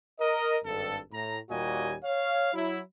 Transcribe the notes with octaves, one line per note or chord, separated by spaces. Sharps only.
A#4 D#5
G#1 G2 A4
A2 A#5
D#2 A#2 G3 F#4 D#5 G#5
C#5 F5
F#3 E4